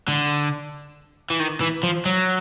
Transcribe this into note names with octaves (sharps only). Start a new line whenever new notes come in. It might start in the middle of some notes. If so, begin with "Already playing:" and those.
D3
E3
D#3
E3
F3
F#3